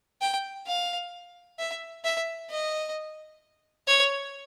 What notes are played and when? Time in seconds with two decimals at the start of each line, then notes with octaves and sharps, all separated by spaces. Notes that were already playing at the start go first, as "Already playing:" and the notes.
0.21 G5
0.67 F5
1.59 E5
2.05 E5
2.50 D#5
3.87 C#5